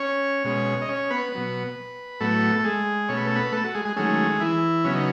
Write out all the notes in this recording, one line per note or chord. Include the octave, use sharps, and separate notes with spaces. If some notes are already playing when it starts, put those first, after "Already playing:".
Already playing: C#4 C#5
B2 G#3 C#4
D#5
C#4 C#5
B3 B4
B2 F#3 B3
A2 F#3 A3 B3 A4
A4
G#3 G#4
B2 A3 C#4 C#5
B4
A4
B3 B4
A3 A4
F#4
G#3 G#4
G#3 G#4
D#3 F#3 G#3 A3 C#4 G#4
E3 E4
C#3 F#3 B3 C#4
D#4